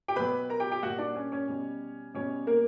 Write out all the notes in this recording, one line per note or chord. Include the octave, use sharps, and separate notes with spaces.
G4 G5
B2 F#3 B4 B5
A#4 A#5
G4 G5
G4 G5
A#2 G3 F#4 F#5
D4 D5
C#4 C#5
C#4 C#5
B2 G3
B2 G3 C#4 C#5
A#3 A#4